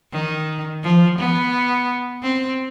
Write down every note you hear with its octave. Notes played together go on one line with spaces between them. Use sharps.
D#3
F3
B3
C4